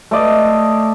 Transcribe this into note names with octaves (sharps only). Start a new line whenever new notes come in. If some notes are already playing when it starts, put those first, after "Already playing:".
A3 D5 D#5